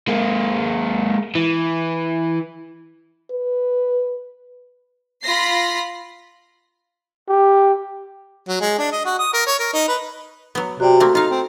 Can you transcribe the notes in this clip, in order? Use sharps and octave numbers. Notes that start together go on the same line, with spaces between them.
G#3 A#3
E3
B4
F4 B5 A#6 C7
G4
F#3
G#3
D4
D#5
F#4
D#6
A#4
C#5
A#4
D#4
B4
F#3 B3
C3 F#4 D5 G5
A3 A#3 C4
D#4 F4 F5
C4